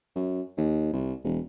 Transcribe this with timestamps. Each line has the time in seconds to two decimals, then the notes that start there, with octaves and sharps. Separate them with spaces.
0.16 F#2
0.57 D#2
0.93 C2
1.24 E1